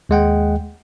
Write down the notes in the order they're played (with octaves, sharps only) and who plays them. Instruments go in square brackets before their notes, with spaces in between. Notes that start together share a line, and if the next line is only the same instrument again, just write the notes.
[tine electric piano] D#2 G#3 F#5 G5